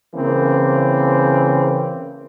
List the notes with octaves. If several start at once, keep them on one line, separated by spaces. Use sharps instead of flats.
C#3 E3 A#3 C4